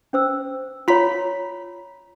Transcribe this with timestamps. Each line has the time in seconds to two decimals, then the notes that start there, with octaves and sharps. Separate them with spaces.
0.13 C#4 C5 E6
0.88 F4 C#5 A#5 B5 B6